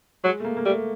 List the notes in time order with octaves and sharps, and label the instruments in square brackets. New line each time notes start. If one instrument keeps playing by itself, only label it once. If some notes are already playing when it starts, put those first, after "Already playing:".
[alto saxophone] F#3 [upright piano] G#3
[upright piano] A3
A#3
A#3
[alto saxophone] G3 [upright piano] A3